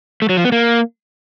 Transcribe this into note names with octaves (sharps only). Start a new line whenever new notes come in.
A3
F#3
F3
B3
A#3